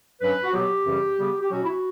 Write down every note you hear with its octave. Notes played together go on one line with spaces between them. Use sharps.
G2 F#3 C#4 B4
F#4
B2 F#3 B3 G4
F#2 C#3 E3 G3
C#3 G3 B3
G4
B2 F#3 C#4 F#4
E4
F#4